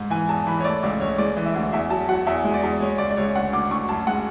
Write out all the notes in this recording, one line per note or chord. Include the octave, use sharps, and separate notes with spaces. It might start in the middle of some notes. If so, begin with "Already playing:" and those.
Already playing: G#2
E3 G#5
E2 A5
E3 B5
C#5
A3 D5
C#2 D5
C#2 C#5
G#3 D5
E3
E5
D2
E2 E5
F#3 A5
F#3 F#5
E2 E5
G#3
D5
E2
G#3 C#5
C#2 D5
D5
C#2 C#5
D2 F#5
D2 D6
D2 C#6
F#2 A5
G#3 F#5